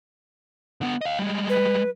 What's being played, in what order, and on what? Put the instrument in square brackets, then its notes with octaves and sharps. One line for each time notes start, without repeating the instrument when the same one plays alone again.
[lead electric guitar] D3 B3
D#5 F5
G3 G#3
[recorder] B4